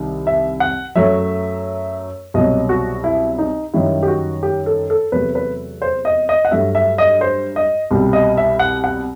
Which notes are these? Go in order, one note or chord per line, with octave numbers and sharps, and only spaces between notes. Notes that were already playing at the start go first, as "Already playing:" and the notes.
Already playing: C2 C3 D#3
E5
F#5
F#2 F#3 A3 E5
C2 B2 F#3 D#5
F#4
E4
D#4
F#2 D#3 G3 E4
G4
F#4
G4
A4
A4
E2 C3 F#3 A3 B4
B4
C5
D#5
D#5
F#5
G2 F#3 A3 E5
E5
D#5
C5
D#5
C2 B2 G3
D#5
E5
F#5
F#5